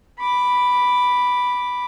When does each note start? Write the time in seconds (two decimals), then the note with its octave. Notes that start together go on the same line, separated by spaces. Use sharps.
0.18 B5 D6